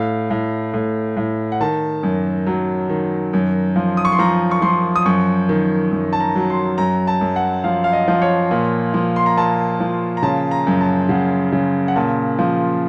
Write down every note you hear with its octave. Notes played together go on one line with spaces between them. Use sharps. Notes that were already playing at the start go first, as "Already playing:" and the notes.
Already playing: A2 F5
A2
A2
A2
F#5
D#3 A5
F#2
F#3
D#3
F#2
F3
D#6
C#6
C6
F3 A#5
C#6
F3 C6
D#6
F#2 C#6
D#3
F#2
A5
A#5
F#3
C6
F#2 A#5
A5
F#2
F#5
F3 F5
F5
D#5
F3
C#5
A#2
F3
C6
A#5
A#2 A5
F3
A#5
C#3 A5
A#5
F#2
A5
C#3 F#5
C#3
F#5
A#2 A5
F3